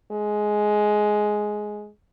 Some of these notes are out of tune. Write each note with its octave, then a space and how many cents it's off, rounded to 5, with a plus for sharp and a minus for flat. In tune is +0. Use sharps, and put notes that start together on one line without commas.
G#3 +10